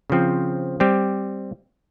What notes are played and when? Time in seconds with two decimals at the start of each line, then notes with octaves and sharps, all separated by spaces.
0.10 C#3 F3 C4
0.80 G3 C4 G4